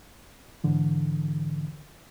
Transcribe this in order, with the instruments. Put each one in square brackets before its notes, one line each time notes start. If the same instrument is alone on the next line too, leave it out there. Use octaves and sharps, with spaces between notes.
[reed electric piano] G#2 D3 E3